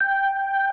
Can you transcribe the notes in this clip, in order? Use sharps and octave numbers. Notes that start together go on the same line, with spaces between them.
G5